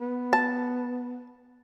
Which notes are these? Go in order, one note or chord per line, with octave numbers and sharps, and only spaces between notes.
B3
A5